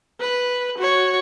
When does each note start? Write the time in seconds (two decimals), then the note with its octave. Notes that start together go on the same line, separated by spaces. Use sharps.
0.20 B4
0.77 F#4 C#5